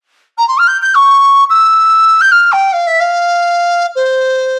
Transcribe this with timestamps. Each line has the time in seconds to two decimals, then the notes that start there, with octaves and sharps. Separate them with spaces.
0.37 A#5
0.48 C6
0.58 F6
0.67 G6
0.81 G6
0.94 C#6
1.49 E6
2.21 G6
2.31 F6
2.52 G5
2.72 F5
2.87 E5
3.00 F5
3.95 C5